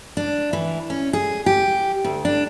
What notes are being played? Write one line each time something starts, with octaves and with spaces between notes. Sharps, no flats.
D4
E3
C#4
G#4
G4
D2
D4